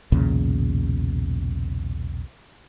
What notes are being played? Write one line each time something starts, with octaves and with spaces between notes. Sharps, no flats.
B1 E2 A#2 C#3